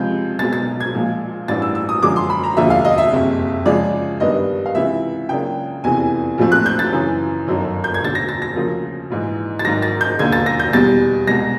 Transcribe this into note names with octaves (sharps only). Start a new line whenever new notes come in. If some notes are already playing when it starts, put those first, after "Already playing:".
Already playing: C#2 C3 F3 G#3 G6
B1 B2 G#3 A6
A6
G#6
A#1 A#2 F3 G#3
A1 G2 E3 A3 D4 A6
E6
E6
D#6
F#2 D3 F3 G#3 C#4 D6
C6
B5
A#5
E1 D#2 D3 F3 E5
F5
D#5
E5
F#1 F2 C3
C#2 C#3 F3 G#3 D5
G2 D#3 G3 B3 D4 D#5
F5
C#2 C3 E3 E5
C#2 C#3 F#3 A#3 D4 G5
F1 E2 C3 E3 G#5
A#1 A2 F3 A3 C4
F#6
G6
A6
F#2 C#3 E3
G1 F#2 D#3 F#3
G6
G#6
E1 D2 D3 A6
A#6
A6
A#6
D2 C#3 F3 A#3
A#1 G#2 E3
A6
G#1 G#2 D#3 F#3 A#6
A6
G6
E1 D#2 D3 G#6
A6
A#6
G6
E2 B2 G3 A6
C2 B2 G#3 A#6